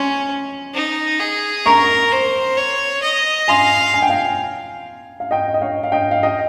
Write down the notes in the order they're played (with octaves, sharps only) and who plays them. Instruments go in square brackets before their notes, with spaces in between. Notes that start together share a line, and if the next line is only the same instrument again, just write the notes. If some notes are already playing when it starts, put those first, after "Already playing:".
Already playing: [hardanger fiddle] C#4 [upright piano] G#5 C6
[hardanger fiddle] D#4
G#4
[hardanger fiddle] A#4 [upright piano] A#5 C#6
[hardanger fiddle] C5
C#5
D#5
[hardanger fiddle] F5 [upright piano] G#5 C6
[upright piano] G#5
G5
F5 G#5
F5
D#5 G5
D#5
C#5 F5
F5
D#5 G5
F5
D#5 G5